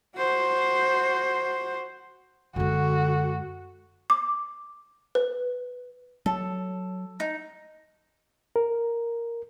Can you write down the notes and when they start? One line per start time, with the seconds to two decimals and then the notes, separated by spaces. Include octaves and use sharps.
0.16 F#4 C5
2.56 F#2 D3 G#3 F#4
4.10 D6
5.15 B4
6.26 F#3 A4
7.20 D#4
8.56 A#4